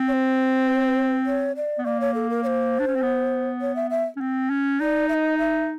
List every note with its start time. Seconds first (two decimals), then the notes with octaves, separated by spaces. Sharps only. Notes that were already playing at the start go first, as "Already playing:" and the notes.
Already playing: C4
0.08 C#5
0.13 C5
1.26 C#5
1.56 D5
1.78 B3
1.85 A#3 D5
2.00 C#5
2.14 A4
2.30 A#4
2.43 C#5
2.47 C5
2.79 D4
2.87 C#4
2.95 C4
3.02 B3
3.61 C#5
3.76 E5
3.91 E5
4.16 C#4
4.21 C4
4.50 C#4
4.80 D#4 D5
5.09 E5
5.14 D#5
5.38 E5